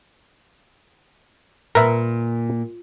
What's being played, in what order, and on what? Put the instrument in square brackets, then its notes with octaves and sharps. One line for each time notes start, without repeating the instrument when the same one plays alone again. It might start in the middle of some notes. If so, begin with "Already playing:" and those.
[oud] A#2 [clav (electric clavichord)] A#4 B4 E5